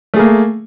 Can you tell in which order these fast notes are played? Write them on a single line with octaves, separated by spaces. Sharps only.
A3 G#4 A#3